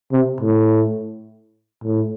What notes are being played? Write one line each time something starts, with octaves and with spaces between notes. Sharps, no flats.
C3
A2
A2